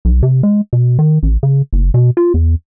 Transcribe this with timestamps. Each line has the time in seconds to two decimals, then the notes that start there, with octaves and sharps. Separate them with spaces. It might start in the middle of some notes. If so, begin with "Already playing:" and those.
0.05 B1
0.23 C3
0.43 G#3
0.73 B2
0.99 D#3
1.23 A1
1.43 C#3
1.73 F#1
1.94 B2
2.17 F4
2.34 E2